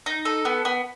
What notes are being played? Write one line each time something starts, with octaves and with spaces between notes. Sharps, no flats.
D#4
A4
B3
B3